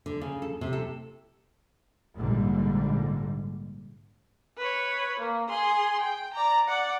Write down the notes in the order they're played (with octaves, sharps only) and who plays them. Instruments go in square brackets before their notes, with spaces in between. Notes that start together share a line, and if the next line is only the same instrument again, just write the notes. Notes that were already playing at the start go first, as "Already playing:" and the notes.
[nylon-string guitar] D3
C#3
A4
C3
A4
[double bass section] A#1 G#2 D3 G3
[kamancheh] B4 C#5
A#3
G#4 C6
G5
D5 A#5
D5 F#5